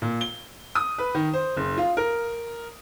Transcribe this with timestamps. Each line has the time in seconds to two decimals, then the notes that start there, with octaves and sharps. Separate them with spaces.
0.02 A#2
0.21 G7
0.75 D#6
0.98 B4
1.15 D#3
1.33 C5
1.57 F#1
1.77 F4
1.97 A#4